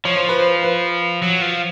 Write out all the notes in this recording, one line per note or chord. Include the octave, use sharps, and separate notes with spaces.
F3 C#5
C5
B4
C5
B4
F#3
F3